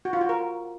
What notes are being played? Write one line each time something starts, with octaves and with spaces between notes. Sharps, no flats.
F#4
F4
F#4
A#4